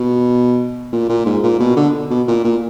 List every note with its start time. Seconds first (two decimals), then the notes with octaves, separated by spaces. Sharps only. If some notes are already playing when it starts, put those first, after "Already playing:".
Already playing: B2
0.93 A#2
1.09 A#2
1.26 G#2
1.43 A#2
1.60 B2
1.77 D3
2.11 B2
2.28 A#2
2.44 A#2